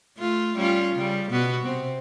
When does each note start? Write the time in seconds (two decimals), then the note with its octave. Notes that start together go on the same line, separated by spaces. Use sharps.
0.18 A3 F4
0.57 G3 C#4 F4
0.96 C#3 G3
1.31 B2 B3 F#4
1.66 C3 C4